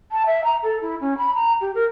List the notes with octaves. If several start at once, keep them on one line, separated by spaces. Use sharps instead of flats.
A5
E5
A#5
A4
E4
C#4
B5
A#5
G4
A#4